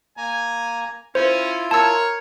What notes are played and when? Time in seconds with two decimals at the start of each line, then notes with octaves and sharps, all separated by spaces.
0.17 A#3 G#5 A#5
1.15 C#4 E4 F4 C5
1.71 A#4 C#5 A5 E6